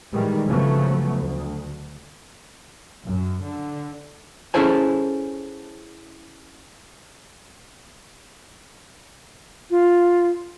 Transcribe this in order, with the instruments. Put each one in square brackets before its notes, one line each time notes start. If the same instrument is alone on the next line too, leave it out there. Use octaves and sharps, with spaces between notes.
[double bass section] A2 D#3 E3 G3 G#3
G1 C#3 F3 F#3 A3 B3
D2
F#2
D3
[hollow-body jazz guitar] C#4 E4 G#4 A4 C5 G#5
[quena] F4